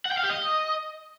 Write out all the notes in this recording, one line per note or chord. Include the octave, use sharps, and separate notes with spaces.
F#5
G5
F5
G4
D#5